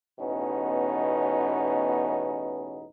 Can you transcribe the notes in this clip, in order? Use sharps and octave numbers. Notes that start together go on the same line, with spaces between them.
A1 E2 B2 B3 C#4 D#4